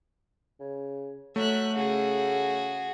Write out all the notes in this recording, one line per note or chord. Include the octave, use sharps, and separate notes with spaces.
C#3
F#3 A3 E5 F#6
C#3 F#4 G#4